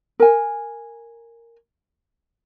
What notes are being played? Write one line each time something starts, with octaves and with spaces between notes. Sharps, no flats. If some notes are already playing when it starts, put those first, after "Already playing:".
A#4 G#5